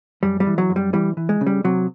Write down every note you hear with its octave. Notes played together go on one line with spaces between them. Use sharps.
F#2 G3
G3
E3
F#3
F#2
G3
E3 G3
E3
G#3
C#3
G3
C3 F#3